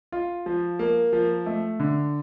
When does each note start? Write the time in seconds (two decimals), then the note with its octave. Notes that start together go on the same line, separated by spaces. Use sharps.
0.12 F4
0.46 F3
0.79 A#3
1.13 F3
1.46 A3
1.80 D3